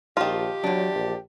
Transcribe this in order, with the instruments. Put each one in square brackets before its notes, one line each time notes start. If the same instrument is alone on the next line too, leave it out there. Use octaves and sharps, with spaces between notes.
[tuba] A#1 [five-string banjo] D#3 F4 [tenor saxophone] G4 [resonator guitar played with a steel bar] A5
[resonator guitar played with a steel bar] E2 D4 [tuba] F#3
[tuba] A#1